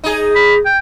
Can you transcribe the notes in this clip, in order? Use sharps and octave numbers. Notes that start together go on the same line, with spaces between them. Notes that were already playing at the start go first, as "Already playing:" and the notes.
D#4 G#4
B5
G5